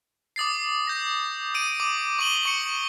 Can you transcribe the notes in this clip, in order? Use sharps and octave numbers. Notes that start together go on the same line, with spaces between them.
D6 D#6 A6 C7
G6 A#6
D#6 D7 D#7
D6
C#6 D6 D#7 F#7 G7
C#6 C#7